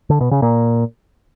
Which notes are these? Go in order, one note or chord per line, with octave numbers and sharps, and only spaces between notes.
D3
B2
C#3
A#2